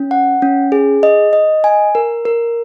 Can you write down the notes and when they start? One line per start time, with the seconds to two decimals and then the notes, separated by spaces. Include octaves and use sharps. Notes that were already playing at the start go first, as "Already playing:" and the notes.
Already playing: C#4
0.11 F#5
0.42 C#4
0.72 G#4
1.03 D#5
1.33 D#5
1.64 G#5
1.95 A#4
2.25 A#4